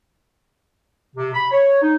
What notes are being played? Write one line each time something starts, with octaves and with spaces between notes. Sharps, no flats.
C3
B5
C#5
D#4